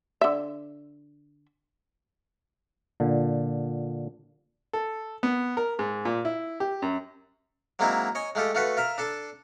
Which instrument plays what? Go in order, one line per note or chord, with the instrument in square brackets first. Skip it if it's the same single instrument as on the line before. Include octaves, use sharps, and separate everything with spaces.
[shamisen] D3 E5
[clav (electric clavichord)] A#2 D3
[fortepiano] A4
B3
A#4
G#2
A#2
E4
G4
F#2
[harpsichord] F#3 G#3 A#3 C4 D#4 E4
C#5 D#5 G#5
G#3 A3 F4 G4 A4
A3 F4 F#4 A4 B4
F4 A#4 E5
D4 A4 A5